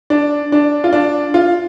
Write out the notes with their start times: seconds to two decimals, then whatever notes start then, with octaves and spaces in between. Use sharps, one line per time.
0.10 D4
0.52 D4
0.84 F4
0.93 D4
1.34 F4